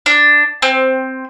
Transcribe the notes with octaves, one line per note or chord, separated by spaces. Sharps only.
D4
C4